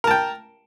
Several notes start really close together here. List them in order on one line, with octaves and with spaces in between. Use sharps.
A#4 A5 G5